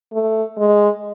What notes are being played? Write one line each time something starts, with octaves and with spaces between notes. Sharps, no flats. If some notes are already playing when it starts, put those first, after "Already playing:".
A3
G#3